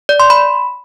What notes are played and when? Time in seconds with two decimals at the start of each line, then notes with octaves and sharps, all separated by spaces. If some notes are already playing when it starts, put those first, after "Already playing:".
0.09 D5
0.20 C6
0.30 B5